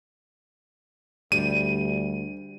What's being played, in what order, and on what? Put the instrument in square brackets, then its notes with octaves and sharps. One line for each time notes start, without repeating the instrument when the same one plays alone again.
[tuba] D2 [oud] G3 [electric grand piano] D#7